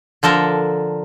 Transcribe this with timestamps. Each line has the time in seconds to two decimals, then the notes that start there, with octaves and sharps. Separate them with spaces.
0.23 D3 F3 A4 A#4